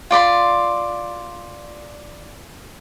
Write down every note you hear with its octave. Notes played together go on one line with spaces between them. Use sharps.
F4 D5 B5 C6